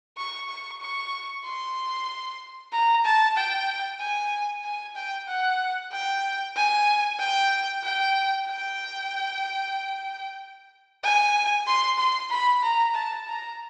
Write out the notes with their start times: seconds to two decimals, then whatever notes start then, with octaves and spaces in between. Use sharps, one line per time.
0.17 C#6
0.49 C#6
0.81 C#6
1.45 C6
2.73 A#5
3.05 A5
3.37 G5
4.00 G#5
4.64 G#5
4.95 G5
5.28 F#5
5.92 G5
6.56 G#5
7.20 G5
7.84 G5
8.47 G5
11.03 G#5
11.67 C6
11.99 C6
12.31 B5
12.63 A#5
12.95 A5
13.27 A#5